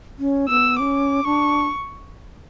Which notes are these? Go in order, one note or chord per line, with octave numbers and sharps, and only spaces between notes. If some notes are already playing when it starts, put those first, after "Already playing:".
C#4
B3 E6
C#4 D6
D4 C#6